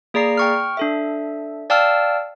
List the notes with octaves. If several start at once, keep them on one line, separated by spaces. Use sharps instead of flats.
A#3 G#4 D5 A#5 C7
G5 C#6 F6
D4 A4 E5
D5 F5 G5 A5 E6 F6